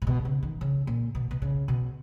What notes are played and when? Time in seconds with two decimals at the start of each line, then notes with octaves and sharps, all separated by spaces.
0.02 A#2
0.07 B2
0.25 C#3
0.43 D#3
0.61 C#3
0.87 A#2
1.15 B2
1.31 B2
1.42 C#3
1.68 B2